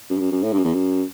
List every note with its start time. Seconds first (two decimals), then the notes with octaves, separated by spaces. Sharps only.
0.10 F#2
0.16 G2
0.20 F#2
0.32 F#2
0.43 A2
0.52 G2
0.58 F#2
0.64 E2
0.74 F#2